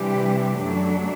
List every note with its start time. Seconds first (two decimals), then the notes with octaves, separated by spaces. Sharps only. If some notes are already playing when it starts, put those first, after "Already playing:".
Already playing: C3 E3 G3 D4 G4
0.58 F#2 F#3 A3 D4